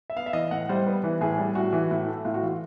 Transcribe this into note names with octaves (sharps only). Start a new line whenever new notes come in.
E5
B3 F5
E5
E3 D#5
A2 F#5
G3 C5
B3 B4
E3
A2 G#4
G3
A2 F#4
E3
A2
A3
A2 F4
F#4
E3 F4